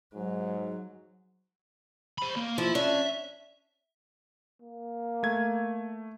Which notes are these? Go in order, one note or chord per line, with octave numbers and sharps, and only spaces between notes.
G#2 F#3
C5 B5
A#3
F3 E4
C#4 D4 E5
A#3
A3 G#6